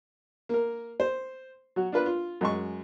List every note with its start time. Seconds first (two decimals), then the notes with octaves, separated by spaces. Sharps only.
0.49 A#3 A#4
1.00 C5
1.76 F#3 F#4
1.92 D4 F4 B4
2.06 F4
2.41 F#2 G#3 C#6